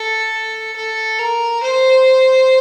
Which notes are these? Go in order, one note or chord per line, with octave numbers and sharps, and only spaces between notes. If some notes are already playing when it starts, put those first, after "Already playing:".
Already playing: A4
A4
A#4
C5